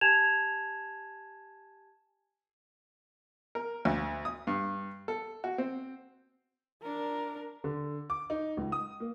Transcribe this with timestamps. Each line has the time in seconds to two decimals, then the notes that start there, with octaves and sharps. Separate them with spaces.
0.01 G4 G#5 A5 G#6 E7 F7
3.55 A#4
3.85 D2
4.25 D#6
4.47 G2
5.08 A4
5.44 F#4
5.58 C4
6.82 D4 A#4
7.64 D3
8.10 D6
8.30 D#4
8.57 C#2
8.72 D#6
9.00 A#3